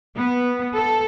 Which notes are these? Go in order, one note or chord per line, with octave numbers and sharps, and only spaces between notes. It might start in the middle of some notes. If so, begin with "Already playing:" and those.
B3
A4